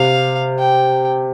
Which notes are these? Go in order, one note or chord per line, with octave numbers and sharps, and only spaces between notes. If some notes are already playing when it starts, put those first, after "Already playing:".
Already playing: C3 F5
G5